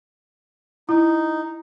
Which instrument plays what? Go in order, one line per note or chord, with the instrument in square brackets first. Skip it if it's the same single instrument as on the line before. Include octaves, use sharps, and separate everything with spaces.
[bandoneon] D#4 [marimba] E4